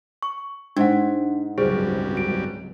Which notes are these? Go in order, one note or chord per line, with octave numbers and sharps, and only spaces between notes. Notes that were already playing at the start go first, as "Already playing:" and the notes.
C#6
G#2 D4 F#5
G#1 C#2 F#2 F#3 G3 G#4 C5
D7